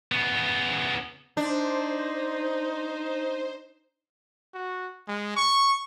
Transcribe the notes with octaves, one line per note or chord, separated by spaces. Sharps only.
C#3 B3
D4 D#4 C5
F#4
G#3
C#6